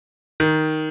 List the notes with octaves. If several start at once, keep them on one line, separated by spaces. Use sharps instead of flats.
D#3